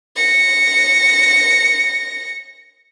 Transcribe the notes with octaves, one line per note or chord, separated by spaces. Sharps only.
A#6 C#7